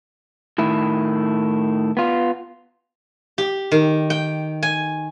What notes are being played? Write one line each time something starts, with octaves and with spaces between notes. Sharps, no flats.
A2 D#3 E4
B3 F4
G4
D#3
G5
G#5